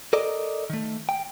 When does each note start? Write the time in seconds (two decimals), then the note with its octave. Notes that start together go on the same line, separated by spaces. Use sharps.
0.13 A4 A#4 D5 D#5
0.70 D#3 A3
1.09 G5